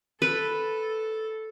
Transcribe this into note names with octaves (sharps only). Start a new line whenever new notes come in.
A4 B4